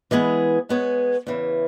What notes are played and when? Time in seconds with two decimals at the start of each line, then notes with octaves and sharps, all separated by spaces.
0.11 E3 G#3 B3 G#4
0.69 G#3 B3 G#4 C#5
1.27 E2 C#3 E3